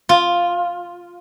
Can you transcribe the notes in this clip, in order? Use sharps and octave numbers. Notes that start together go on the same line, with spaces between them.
F4